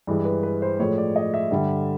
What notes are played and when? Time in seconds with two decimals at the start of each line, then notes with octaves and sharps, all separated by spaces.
0.07 G2 E3 G#3
0.25 B4
0.43 B4
0.62 C5
0.80 A2 F3 G#3 C#5
0.98 D5
1.16 D#5
1.34 E5
1.51 G2 D3 G3